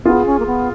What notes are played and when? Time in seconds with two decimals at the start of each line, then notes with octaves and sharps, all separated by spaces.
0.04 B3 F4 G#4
0.26 C#4
0.39 A#3
0.46 B3